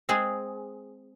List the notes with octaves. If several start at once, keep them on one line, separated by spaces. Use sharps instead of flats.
G#3 C4 G#4